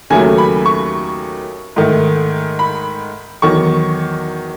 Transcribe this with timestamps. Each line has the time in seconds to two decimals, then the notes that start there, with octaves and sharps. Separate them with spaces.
0.10 D#2 C#3 F#3 A3 G#5
0.38 B5
0.66 C#6
1.76 G#2 D#3 A3
2.59 B5
3.42 E2 D#3 F#3 C#6